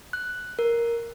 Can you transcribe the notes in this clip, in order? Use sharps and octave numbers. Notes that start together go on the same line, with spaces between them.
F#6
A#4